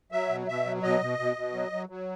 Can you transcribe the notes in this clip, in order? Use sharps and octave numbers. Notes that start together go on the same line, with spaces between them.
F#3 E5
B2
B2 E5
F#3
B2 D#5
B2
B2
B2
F#3
F#3
F#3